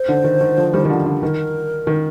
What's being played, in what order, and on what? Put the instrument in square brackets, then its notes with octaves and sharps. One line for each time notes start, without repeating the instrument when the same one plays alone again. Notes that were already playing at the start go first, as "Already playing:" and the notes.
Already playing: [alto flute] C5
[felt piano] D3
D#3
D#3
D3 F3
D#3 G3
D#3
D3 F3
D3
[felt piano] D#3 [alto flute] A#4
[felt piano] D#3